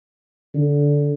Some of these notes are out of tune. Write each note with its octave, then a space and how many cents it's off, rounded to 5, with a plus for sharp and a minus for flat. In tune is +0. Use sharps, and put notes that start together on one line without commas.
D3 -15